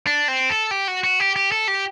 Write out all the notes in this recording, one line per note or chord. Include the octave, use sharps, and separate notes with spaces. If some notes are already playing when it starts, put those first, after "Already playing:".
D4
C4
A4
G4
F#4
F#4
G4
G4
A4
G4